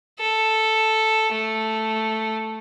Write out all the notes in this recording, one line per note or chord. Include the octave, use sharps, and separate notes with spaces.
A4
A3